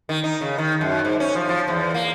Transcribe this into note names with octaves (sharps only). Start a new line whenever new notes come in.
D#3
D#4
C#3
D#3
F#2
G#2
C#4
F3
F3
E2
A#3